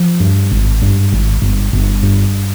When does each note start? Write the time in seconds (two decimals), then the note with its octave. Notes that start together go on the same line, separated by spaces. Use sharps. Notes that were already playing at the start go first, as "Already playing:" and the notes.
Already playing: F3
0.20 G2
0.51 G#1
0.82 G2
1.12 G#1
1.42 G1
1.73 G1
2.03 G2